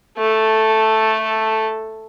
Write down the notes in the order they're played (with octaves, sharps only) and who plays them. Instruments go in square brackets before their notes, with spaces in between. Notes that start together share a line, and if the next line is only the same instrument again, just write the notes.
[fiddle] A3 A4